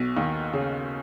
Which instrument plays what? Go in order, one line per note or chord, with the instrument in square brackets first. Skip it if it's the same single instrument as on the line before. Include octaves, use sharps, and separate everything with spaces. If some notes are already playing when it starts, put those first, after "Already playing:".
Already playing: [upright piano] B1 B2
D#2 D#3
C#3